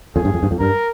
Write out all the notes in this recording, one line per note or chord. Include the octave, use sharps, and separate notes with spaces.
F2 G#4
G2
F2
G2
F2
G2 A#4